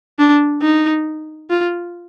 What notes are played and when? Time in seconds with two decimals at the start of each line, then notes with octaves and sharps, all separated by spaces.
0.19 D4
0.62 D#4
1.50 F4